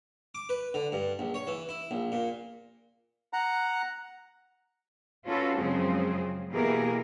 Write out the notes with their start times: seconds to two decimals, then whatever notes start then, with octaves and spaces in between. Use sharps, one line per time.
0.35 D6
0.49 B4
0.74 D3
0.92 G2
1.19 A#1
1.34 C#5
1.47 E3
1.69 E4
1.91 A#1
2.12 A#2
3.33 F#5 A#5
5.25 C#4 F4 F#4 A4 B4
5.56 F#2 C#3 F3 G#3 C4 G#4
6.50 B2 E3 A#3 G4 G#4 A#4